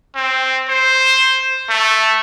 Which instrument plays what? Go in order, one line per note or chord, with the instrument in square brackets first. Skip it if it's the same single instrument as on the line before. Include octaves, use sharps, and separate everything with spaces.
[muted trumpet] C4
C5
A3